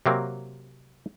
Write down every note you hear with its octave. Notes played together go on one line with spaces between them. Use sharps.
C3 F#3 A#3 C4